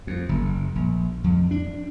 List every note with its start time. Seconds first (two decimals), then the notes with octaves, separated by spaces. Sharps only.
0.07 F2
0.29 F#1
0.75 A#1
1.24 F2
1.51 D4